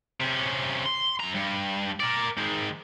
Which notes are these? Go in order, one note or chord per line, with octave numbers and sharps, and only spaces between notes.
C3 C#4
C6
F#2 A#5
G2
A#4 D5
D#3 G#3